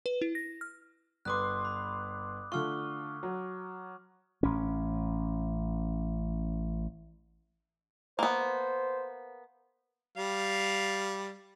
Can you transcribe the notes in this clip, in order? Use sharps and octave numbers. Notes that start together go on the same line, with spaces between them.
B4
E4
A#6
F6
G1 B4 C6 D6 D#6 F#6
B5
D3 A3 F4 C#6 F6
F#3
A1 C#4
A#3 B3 C5
G3 F5